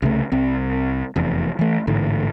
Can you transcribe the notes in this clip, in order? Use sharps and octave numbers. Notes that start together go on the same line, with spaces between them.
C2 C#3 A3
C2 C4
F1 E2
E3 A3
A1 G#2 D3